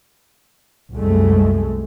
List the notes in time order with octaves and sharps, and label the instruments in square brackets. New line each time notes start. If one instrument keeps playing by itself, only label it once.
[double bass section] C2 F#2 G#3 A3